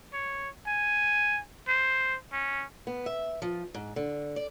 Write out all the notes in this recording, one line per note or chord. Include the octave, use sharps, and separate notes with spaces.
C#5
G#5
C5
C#4
B3
E5
F3
G#2
D3
D5